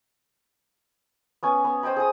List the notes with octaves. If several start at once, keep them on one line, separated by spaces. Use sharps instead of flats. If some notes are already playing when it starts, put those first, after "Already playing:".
B3 C#4 G#5
B3
C5 D#5 G5 B5
G#4 D#6